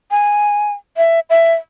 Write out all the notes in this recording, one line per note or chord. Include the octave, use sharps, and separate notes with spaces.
G#5
E5
E5